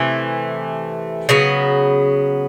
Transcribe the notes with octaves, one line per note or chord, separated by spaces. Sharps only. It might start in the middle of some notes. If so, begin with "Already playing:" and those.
Already playing: C3 E3 A3
C#3 F#3 B3